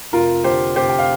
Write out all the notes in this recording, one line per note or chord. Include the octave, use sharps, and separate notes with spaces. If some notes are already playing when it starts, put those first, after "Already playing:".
F1 F4 A#4
D3 G4 C5
F1 G4 C5
G5
F5